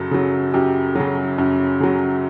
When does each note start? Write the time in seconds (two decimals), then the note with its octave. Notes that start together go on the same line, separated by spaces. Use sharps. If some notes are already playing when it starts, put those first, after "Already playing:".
Already playing: F#2 C#3 F#3 A4
0.11 C#3 F#3
0.54 F#2 G4
0.95 C#3 F#3
1.38 F#2
1.80 C#3 F#3